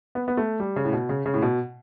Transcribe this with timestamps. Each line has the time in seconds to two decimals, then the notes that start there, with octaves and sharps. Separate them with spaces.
0.15 B3
0.28 B3
0.37 A3
0.60 G3
0.76 C#3
0.85 A2
0.93 B2
1.09 C#3
1.26 C#3
1.34 A2
1.42 B2